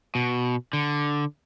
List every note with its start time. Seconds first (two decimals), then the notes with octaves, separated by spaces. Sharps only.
0.15 B2
0.73 D3